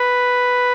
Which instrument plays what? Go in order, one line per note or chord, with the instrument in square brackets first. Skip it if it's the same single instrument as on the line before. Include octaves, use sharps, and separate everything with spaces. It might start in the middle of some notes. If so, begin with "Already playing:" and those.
Already playing: [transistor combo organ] B4